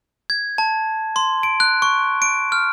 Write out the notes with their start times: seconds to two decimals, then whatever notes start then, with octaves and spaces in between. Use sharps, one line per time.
0.30 G#6
0.58 A5
1.16 C6
1.43 D7
1.60 F#6
1.82 C#6
2.22 D7
2.52 F6